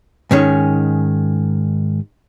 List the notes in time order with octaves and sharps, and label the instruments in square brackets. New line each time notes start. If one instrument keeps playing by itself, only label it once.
[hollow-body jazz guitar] G#2 D#3 C#4